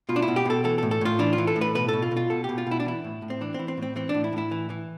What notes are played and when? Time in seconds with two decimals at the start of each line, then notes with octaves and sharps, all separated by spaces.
0.09 B2 F4
0.16 D4
0.22 E4
0.28 B2
0.36 G4
0.45 B2 A4
0.64 E3 A4
0.78 A4
0.83 A2
0.91 A4
1.01 A2 F4
1.19 E3 D4
1.33 F4
1.38 E3
1.47 A4
1.56 A2
1.61 B4
1.75 B2 B4
1.88 B2 A4
2.02 F4
2.11 B2
2.17 F4
2.30 B2 A4
2.44 B2 G4
2.58 F4
2.67 B2 E4
2.80 D4
2.86 E3 E4
3.04 A2
3.22 A2
3.30 C4
3.41 E3 D4
3.54 C4
3.59 E3
3.68 C4
3.77 A2
3.82 C4
3.96 E3 C4
4.09 D4
4.14 A2
4.24 E4
4.32 A2
4.38 E4
4.51 E3
4.70 E3